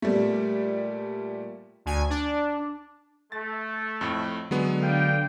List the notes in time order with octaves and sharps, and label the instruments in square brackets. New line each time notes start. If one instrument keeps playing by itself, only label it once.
[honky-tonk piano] A#2 G3 A3
[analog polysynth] D2 G#5
D4
[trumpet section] A3 [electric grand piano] A6
[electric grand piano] F2 A2
[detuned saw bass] D3 [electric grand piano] F#3 G#3 B3
[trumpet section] D5 F5 G5